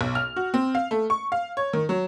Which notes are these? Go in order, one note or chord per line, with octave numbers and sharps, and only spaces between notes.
B1
F6
F#4
C4
F5
A3
C#6
F5
C#5
D#3
F#3